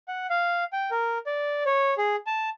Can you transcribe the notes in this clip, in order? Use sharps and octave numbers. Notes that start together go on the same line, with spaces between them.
F#5
F5
G5
A#4
D5
C#5
G#4
A5